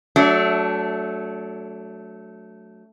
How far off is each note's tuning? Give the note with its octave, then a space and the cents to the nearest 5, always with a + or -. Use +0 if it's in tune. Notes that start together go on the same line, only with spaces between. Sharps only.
F#3 +5 A3 +0 D4 -30